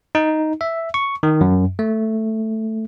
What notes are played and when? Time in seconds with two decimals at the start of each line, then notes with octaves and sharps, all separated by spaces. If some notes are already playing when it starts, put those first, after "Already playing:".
0.15 D#4
0.61 E5
0.94 C#6
1.23 D#3
1.41 F#2
1.79 A3